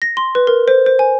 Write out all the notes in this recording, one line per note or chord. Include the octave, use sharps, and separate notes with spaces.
A#6
C6
B4
A#4
C5
C5
G#5